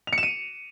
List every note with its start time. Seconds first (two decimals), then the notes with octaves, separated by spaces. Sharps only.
0.07 F7
0.13 C#7
0.18 E7
0.23 D#7